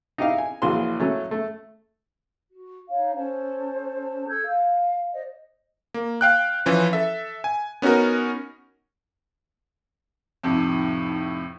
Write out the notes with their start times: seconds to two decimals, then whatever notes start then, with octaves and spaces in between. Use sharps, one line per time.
0.18 D#4 E4 G4 D#5 F5
0.38 G#5
0.62 A#1 C#3 E3 F#4 C6
1.00 F#3 A3 C#4
1.31 A3
2.50 F#4
2.90 D#4 C#5 F5
3.16 C#4 A4 C5 A5
4.28 A4 E6 G6 G#6
4.46 F5
5.13 C5 D5 D#5
5.94 A#3
6.21 F5 G5 F#6
6.66 E3 F3 C#4 B4
6.93 A4 E5
7.44 G#5
7.82 B3 C#4 D#4 F#4 A#4
10.44 F2 A2 C3 D#4 A5